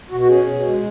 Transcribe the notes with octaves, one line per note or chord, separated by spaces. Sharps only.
B2 F#4
F#4
C#4 G#4
B2
G#3